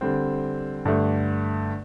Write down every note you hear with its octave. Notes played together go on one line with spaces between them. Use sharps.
D3 G3 C4
G2 D3 A3